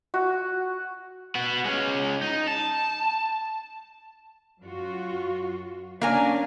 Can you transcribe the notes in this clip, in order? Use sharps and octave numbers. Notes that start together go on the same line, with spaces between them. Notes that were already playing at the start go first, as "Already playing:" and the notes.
F#4
B3 F#4
G#3 C#4
D#4
A5
F#2 F4 F#4
A#3 C#4 D4 A#4 G#5